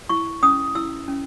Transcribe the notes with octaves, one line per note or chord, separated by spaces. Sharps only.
E4 C#6
C#4 D#6
E4 E6
C#4